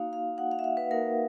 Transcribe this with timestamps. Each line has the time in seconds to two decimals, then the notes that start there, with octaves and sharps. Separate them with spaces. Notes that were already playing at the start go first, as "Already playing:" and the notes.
Already playing: A#3 D#4 F#4 F5
0.13 F5
0.38 A#3 D#4 F#4 F#5
0.51 F5
0.59 E5
0.64 F5
0.77 B4
0.90 A#3 D#4 F#4 A#4